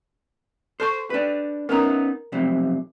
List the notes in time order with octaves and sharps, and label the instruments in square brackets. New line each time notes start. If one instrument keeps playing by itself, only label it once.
[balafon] A4 A5 C#6 [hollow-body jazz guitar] C5
[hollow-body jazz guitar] D4 B4
[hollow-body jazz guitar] B3 C#4 D#4 [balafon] A#4 A#5
[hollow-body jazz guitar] B1 F2 C3